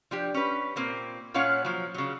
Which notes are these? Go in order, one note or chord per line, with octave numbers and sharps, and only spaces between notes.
F3 D4 G4
C#4 B4
A#2 A#3 C4
A#2 C#4 F4 C#5 F5 F#5
F3 F#3
C#3 F#3